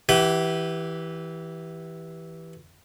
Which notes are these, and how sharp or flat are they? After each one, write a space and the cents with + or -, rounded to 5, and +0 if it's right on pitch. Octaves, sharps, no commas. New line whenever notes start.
E3 -10 G4 +0 F#5 +35